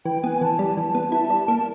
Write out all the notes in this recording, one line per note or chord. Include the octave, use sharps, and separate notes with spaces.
E3 G5
B3 G#5
E3 A5
G3
E3
B3
E4 A5
G3
A#3